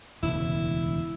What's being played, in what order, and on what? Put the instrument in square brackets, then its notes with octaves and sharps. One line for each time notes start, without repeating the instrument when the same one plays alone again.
[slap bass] E1 D2 C#3 [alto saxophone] E4